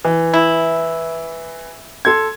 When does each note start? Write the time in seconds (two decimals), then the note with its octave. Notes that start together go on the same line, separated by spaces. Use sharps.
0.05 E3
0.34 E4
2.05 A4 C6 G#6